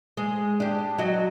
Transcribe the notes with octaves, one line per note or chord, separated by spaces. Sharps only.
G#3
D4 G4
F#3 F#4 D#5